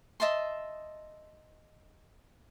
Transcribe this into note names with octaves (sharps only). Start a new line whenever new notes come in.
D#5 E5 A5 C6